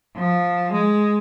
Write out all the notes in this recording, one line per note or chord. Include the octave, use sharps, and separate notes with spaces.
F3
G#3